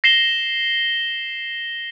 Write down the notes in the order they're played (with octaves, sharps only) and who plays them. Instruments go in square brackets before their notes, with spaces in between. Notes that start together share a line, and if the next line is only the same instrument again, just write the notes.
[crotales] A#6 C7 E7 G7